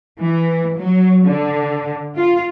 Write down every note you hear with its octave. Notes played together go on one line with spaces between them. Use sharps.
E3
F#3
D3
F4